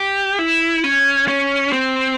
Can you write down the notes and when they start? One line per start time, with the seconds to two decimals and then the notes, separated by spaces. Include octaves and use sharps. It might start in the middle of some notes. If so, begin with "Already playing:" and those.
Already playing: G4
0.39 E4
0.84 C#4
1.28 C#4
1.73 C4